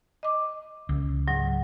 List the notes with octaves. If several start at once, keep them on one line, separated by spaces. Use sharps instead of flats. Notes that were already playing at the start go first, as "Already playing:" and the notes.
D#5 D6
C#2
G#2 F#3